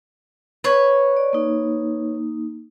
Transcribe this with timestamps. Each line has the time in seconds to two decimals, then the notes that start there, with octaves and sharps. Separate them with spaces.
0.64 B4 C#5
1.17 D5
1.33 A#3 D#4